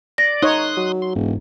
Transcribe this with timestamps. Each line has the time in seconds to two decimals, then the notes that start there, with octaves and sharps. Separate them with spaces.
0.18 D5 A#6
0.42 D#4 C#5 C6 D#6 F#6
0.77 F#3
1.02 C6
1.15 E1 G#2